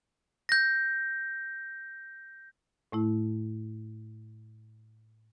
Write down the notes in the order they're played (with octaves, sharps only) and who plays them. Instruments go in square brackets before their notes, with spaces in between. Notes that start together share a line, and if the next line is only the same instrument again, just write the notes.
[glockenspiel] G6 A#6
[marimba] A2 A3 E4